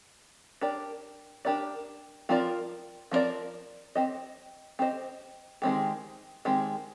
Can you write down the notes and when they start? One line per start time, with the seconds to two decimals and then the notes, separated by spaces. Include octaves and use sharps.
0.61 D4 G4 A#4 D5
1.45 D4 G4 A#4 D5
2.29 F3 C4 F4 A#4 D5
3.11 F3 C4 F4 A#4 D5
3.95 C4 G4 C5 D#5
4.79 C4 G4 C5 D#5
5.62 D#3 G#3 C4 G4
6.45 D#3 G#3 C4 G4